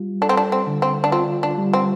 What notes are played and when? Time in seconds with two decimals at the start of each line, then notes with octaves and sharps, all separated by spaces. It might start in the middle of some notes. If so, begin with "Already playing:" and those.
Already playing: G3 F4
0.22 D4 A4
0.29 C4
0.37 D4
0.52 C4
0.67 D3
0.82 C4
1.04 D4
1.12 C4 F4
1.43 D4
1.58 G3
1.74 C4